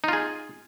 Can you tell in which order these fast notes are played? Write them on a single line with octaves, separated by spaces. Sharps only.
D#4 F4 G#4